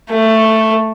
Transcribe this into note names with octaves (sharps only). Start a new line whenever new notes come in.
A3